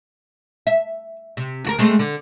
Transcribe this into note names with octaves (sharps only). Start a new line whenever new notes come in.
E5
C3
D2 F#4 A#4
G#3 A3 C4
D3